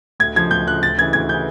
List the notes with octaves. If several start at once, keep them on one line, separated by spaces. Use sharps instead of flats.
D2 G#6
C#3 F3 G#6
D2 G6
C#3 F3 F#6
D2 A6
C#3 E3 G#6
D2 G#6
C#3 E3 G6